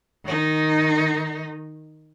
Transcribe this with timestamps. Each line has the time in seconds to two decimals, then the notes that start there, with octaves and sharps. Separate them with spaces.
0.25 D#3 D#4